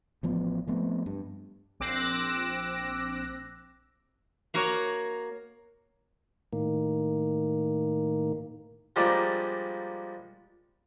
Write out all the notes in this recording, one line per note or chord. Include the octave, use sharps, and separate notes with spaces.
A1 F3 B3
F3 A3 B3 C4
G2
A#1 C4 D6 E6 F#6 A#6
A#3 F#4 A#4 C#5
A2 D#3 A#3
F3 G3 G#3 A#3 D4 D#4